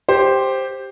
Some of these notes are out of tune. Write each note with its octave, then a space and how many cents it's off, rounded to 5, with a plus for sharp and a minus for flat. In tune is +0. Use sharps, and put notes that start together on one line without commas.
G4 +0 C5 +5